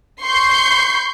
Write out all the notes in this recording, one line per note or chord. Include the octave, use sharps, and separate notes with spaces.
C6 C#6 G6 C7